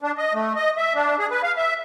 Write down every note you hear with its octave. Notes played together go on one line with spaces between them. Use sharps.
D4
D#5
A3
D#5
E5
D4
G#4
B4
F5
E5